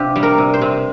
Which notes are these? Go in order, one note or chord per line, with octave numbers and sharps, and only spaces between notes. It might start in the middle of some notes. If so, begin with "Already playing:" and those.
Already playing: C3 D4 F4 G4
G3
A#4
C3
C5
C3